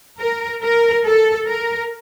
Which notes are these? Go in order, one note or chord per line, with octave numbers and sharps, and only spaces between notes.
A#4
A#4
A4
A#4